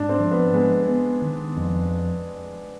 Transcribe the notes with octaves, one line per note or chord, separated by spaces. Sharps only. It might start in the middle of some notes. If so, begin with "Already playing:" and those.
Already playing: G#2 D4
C4
F3
B3
G#3 B3
B3
D#3
F2